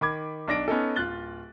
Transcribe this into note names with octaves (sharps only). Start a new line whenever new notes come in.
D#3 B5 D6 G#6
B1 D4 A#6 D7
B3 C#4 D#4 A4
D1 F4 F#6 A6 G7